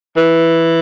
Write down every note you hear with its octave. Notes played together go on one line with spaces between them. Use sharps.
E3